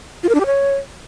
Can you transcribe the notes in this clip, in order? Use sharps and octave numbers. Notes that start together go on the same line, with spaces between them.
F4
A#4
D4
G4
C#5